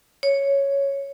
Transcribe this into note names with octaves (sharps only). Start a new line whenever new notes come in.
C#5